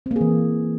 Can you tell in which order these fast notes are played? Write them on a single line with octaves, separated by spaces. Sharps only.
C4 A#3 G#4 E3